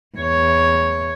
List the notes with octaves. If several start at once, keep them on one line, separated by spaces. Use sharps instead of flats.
E2 C#5